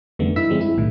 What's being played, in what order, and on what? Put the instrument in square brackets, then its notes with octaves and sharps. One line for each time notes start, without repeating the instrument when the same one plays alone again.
[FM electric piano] F2 D3 D#3 G3 A3 B3
G2 D#4 E4 E6 B6
D3 F3 G3 G#3 C4
E4
B1 A2 D#3